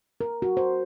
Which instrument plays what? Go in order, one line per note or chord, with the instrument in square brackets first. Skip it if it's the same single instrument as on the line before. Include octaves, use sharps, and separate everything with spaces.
[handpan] A#4
F#4
C5